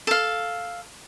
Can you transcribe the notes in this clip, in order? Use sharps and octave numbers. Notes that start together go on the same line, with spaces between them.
A4 F5